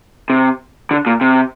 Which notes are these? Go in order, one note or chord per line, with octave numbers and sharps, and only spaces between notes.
C3
D3
A#2
C3